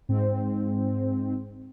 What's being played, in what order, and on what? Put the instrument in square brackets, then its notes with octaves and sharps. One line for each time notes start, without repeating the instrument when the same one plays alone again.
[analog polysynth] G#2 C4